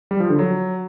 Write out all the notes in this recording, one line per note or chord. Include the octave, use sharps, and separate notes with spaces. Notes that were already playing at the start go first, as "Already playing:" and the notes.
G3
F3
D3
F#3